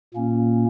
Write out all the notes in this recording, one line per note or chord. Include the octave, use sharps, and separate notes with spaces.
A#2 A#3 C#4